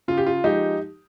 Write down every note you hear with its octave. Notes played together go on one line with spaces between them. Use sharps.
C#3 F4
G4
F4
F3 G#3 D#4 G4